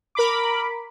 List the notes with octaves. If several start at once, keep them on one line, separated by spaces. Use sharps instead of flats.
A#4 B5 D6